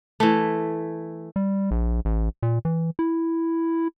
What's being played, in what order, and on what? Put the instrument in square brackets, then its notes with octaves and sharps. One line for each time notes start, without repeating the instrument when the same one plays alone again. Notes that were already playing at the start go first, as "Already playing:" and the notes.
[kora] E3 A3
[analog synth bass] G3
A#1
A1
A#2
E3
E4